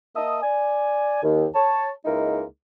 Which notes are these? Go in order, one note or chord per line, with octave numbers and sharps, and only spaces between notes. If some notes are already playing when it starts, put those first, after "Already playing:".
A#3 D#5 E5 A5 D#6
D5 G#5
D#2
C#5 A5
C#2 G#3 A#3 D#4 E4 A#4